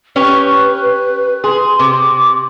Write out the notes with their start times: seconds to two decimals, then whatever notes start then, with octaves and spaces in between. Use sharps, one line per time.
0.16 C#4 G4 B4 C#5
1.44 G#4 C6
1.79 C3 D6